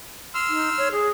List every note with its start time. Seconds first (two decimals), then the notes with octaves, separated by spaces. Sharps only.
0.35 C6 E6 F6
0.49 D#4
0.78 C#5
0.92 G#4